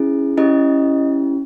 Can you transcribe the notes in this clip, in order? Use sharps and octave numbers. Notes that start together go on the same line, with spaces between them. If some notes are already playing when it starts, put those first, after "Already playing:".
Already playing: C#4 E4 G#4
C#4 E4 G4 D#5